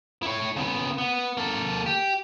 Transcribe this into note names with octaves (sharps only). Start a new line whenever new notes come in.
E4 C#5
C#3 B3
B3
A#3 A4
G4